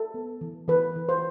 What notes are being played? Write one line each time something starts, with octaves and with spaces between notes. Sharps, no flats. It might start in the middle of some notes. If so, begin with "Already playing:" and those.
Already playing: A4
B3
E3
E3 B4
E3
C5